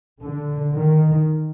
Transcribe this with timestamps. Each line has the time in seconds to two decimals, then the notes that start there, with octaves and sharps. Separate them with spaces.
0.22 D3
0.76 D#3